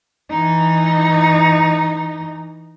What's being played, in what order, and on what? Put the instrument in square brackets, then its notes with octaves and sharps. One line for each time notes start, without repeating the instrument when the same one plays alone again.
[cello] E3 D#4